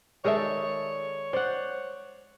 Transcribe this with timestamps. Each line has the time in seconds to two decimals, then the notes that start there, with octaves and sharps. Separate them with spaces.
0.25 D#3 G#3 G#4 A4 C#5 D5 E5
1.33 C5 D5 F#5